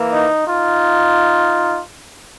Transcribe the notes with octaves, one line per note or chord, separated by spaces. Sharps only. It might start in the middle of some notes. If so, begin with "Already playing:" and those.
Already playing: E3 A#3
D#4
D#4 F4